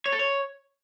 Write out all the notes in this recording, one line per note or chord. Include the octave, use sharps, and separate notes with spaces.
C#5
A4
C#5